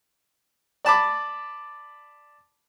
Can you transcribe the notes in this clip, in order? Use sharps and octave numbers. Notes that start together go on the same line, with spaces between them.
D5 A5 B5 D6